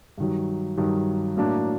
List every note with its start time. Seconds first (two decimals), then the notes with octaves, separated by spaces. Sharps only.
0.18 G2 D#3 F#3
0.77 G2 D#3 F#3
1.37 A2 F#3 A#3 D4